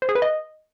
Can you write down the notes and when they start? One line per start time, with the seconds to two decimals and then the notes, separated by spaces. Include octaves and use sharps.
0.02 C5
0.09 G#4
0.15 B4
0.22 D#5